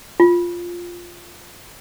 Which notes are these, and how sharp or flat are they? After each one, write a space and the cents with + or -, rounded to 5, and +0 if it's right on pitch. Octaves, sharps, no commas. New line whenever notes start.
F4 +0